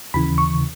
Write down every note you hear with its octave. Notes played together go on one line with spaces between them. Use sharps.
D#2 C#3 E3 B5
C#6